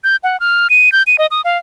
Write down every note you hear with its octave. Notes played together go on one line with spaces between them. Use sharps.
G6
F#5
F6
D#7
G6
D#7
D#5
D#6
F5